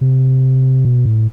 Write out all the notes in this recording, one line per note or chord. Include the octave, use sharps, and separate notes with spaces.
C3
B2
A2